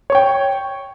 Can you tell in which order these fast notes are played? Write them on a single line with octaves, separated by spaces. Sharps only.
C#5 C#6 G5